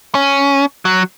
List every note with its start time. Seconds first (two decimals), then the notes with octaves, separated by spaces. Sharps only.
0.15 C#4
0.85 F#3